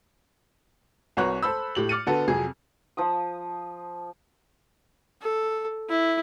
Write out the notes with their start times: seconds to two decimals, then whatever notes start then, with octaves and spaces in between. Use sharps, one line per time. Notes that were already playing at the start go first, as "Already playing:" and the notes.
1.17 C2 F#4 B4 C#5 A#5 F#6
1.43 A4 C5 B5 E6
1.75 A2 G4 F#7
1.89 D6 F6 A6 C#7 D#7
2.07 D3 B3 F#4 A4
2.28 F2 C3 F#3 G#4
2.97 F3 D#6
5.22 A4
5.90 E4